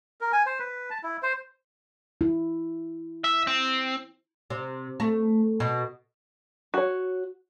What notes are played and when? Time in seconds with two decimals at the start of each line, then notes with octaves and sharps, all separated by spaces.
0.21 A#4
0.33 G#5
0.46 C5
0.59 B4
0.90 A5
1.03 E4
1.23 C5
2.21 E4
3.24 E5
3.47 C4
4.50 C3
5.00 A3
5.60 B2
6.74 F#4 C#5